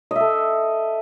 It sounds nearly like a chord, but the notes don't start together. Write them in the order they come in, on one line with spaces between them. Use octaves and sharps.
D#5 E5 A4